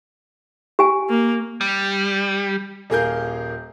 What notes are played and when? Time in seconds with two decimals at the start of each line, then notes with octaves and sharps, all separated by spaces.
0.79 G4 G#5
1.10 A#3
1.61 G3
2.90 D#1 A#3 G#4 A#4 F5 G6